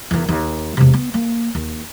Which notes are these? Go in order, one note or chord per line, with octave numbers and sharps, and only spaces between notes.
E2 D#3
D#2
E1 C3
B3
A#3
D#2